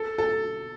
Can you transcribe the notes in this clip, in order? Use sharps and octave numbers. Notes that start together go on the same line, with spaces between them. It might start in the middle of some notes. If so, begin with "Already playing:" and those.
Already playing: A4
A4